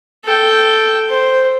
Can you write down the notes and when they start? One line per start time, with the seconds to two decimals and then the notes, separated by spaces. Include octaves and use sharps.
0.25 A4 G5
1.09 C5